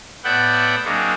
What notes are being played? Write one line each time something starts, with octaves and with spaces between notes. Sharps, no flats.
A2 B3 D5 E5 F#5 G5
F#3 G#3 A#3 C4 D4